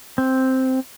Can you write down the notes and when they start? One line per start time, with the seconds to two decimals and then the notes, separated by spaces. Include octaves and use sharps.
0.18 C4